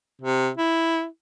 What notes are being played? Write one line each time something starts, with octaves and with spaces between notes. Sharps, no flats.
C3
E4